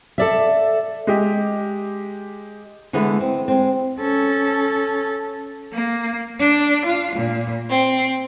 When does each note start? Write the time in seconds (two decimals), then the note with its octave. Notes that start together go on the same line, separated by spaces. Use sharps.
0.18 A4 D5 E5
1.07 G#3 G4
2.93 D3 E3 G#3 A3 B3
3.20 C4
3.48 G#3 C4
4.00 C#4 A4
5.73 A#3
6.39 D4
6.85 F4
7.16 A#2
7.71 C4